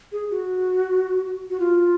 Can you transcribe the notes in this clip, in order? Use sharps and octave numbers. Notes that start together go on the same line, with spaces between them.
G#4
F#4
F#4
F4